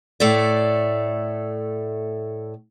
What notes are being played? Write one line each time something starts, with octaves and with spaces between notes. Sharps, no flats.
A2 A3 D5